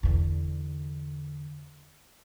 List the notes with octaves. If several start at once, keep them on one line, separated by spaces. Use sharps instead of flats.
E2 D3